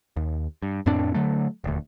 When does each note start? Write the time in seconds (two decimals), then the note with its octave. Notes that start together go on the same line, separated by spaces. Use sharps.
0.17 D#2
0.63 G2
0.86 F2 A2 C4 D4
1.14 D3 F#3 A3
1.64 D#1 D2